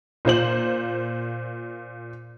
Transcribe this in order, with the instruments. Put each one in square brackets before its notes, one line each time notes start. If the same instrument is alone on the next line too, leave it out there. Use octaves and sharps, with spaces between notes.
[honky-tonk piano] A#2 F4 C5 F#7